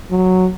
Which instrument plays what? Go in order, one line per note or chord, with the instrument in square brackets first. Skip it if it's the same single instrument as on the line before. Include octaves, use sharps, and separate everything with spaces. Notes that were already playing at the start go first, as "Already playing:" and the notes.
[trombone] F#3